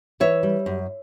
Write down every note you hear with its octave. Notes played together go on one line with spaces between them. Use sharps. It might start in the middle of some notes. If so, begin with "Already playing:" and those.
E3 C#5 E5
G3
F#2